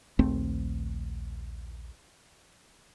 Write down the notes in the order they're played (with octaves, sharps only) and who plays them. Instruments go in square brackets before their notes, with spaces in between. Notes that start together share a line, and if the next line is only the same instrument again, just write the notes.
[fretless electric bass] A#1 D#2 A3 C4